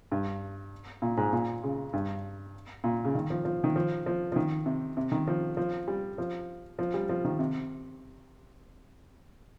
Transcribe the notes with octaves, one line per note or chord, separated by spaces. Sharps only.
G2
A#2
G#2
A#2
C#3
G2
A#2
C#3
D#3
F3
F3
D#3
F3
F3
F3
D#3
C3
C3
D#3
F3
F3
G3
F3
F3
G3
F3
D#3
C3